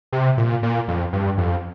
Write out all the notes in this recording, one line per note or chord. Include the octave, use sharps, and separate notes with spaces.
C3
A#2
A#2
F2
G2
F2